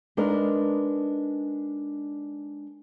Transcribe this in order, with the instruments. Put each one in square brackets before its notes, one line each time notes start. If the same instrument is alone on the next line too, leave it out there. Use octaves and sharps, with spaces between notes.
[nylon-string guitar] G#3 D4 D#4 A#4 B4 D#5